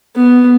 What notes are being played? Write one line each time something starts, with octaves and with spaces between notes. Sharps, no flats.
B3